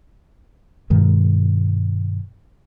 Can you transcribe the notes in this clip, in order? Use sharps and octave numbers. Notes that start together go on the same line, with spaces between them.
G2 B2 D#3 G#3